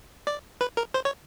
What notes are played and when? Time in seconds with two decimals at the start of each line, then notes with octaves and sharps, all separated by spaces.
0.27 D5
0.61 B4
0.77 A#4
0.94 C5
1.05 C#5